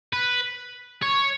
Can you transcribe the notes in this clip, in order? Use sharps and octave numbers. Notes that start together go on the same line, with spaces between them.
B4
C#5